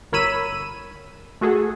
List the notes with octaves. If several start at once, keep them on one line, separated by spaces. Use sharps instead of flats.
G1 A#4 C#5 B5 E6 D#7
A3 F#4 G#4 A4